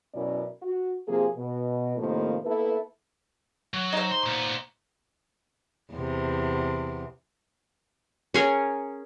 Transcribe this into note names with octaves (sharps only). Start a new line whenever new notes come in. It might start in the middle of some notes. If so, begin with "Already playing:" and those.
F#2 B2 C#4 E4 A#4 D5
F#4
C3 F3 A#3 G#4
B2
A2 C3 D#3 F3 A#3
A#3 B3 E4 A4 B4
F#3
D#4 C5
C6
A#2 B3
E2 C3
C#4 G#4 A#4